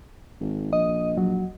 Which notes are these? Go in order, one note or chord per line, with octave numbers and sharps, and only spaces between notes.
G#1
A#1 D#5
F#3